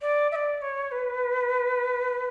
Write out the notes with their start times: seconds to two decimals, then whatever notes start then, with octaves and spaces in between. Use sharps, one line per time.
0.01 D5
0.31 E5
0.35 D5
0.61 C#5
0.91 B4